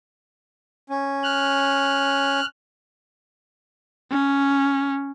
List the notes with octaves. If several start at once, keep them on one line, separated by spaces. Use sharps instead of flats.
C#4
F6 F#6
C#4